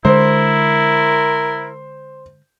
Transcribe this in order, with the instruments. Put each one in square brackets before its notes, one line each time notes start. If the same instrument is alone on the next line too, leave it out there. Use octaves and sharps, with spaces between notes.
[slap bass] D3 G#3 [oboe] E4 [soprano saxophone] A#4 [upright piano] C5